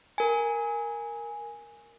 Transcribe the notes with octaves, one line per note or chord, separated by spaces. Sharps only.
A#4 G#5